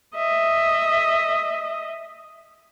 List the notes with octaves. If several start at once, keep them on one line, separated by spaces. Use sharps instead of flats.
D#5 E5